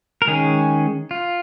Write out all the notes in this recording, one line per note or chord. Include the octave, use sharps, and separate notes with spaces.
A#4
D#3 G#3 C#4 G#4
F4